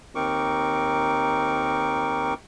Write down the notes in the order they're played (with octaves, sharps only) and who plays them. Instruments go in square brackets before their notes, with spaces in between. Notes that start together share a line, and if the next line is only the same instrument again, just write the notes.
[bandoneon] D#2 C4 D#4 A#4 C#6 D6